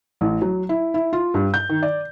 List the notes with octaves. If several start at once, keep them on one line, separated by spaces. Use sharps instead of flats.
A1
F#3
E4
E4
F4
G2
G6
D#3
D5